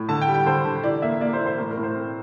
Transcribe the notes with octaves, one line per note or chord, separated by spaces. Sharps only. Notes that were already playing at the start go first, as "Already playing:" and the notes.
Already playing: A2
D3 A5
G5
G3
G5
D3 C5
D3
E3 D5
A#3 E5
A#3 D5
C5
E3
C5
A2 A#4
A#4
A2
C5
C4